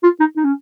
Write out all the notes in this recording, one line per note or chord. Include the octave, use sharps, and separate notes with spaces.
F4
D#4
D#4
C#4